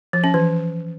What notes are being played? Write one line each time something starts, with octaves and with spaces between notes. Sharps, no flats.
F3
C#4
E3